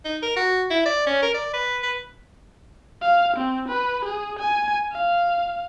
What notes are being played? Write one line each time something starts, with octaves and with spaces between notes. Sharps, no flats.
D#4
A#4
F#4
E4
D5
C#4
A#4
D5
B4
B4
F5
C4
B4
G#4
G#5
F5